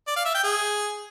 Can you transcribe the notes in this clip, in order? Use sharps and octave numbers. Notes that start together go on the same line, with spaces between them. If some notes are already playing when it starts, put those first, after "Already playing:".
D5
F5
E5
G5
G#4